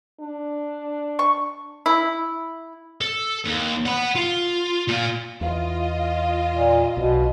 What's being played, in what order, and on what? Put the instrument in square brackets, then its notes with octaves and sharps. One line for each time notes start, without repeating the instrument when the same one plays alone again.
[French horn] D4
[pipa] C#6
E4
[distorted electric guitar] A4
D#2
F#5 B5
F4
A#2 F4
[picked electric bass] E2 [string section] F4 D#5
[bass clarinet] A#2
[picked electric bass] B1 [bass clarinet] B2